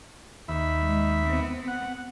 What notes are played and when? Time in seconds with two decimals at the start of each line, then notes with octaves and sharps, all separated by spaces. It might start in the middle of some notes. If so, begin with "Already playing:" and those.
0.48 D#2 E5 B5
0.79 G#3
1.26 B3 C4
1.68 F#5